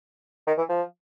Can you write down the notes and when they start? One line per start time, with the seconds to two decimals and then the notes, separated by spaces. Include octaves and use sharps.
0.47 D#3
0.58 E3
0.69 F3